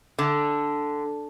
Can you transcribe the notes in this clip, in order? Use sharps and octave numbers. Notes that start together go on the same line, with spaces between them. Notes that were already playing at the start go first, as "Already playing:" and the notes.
D3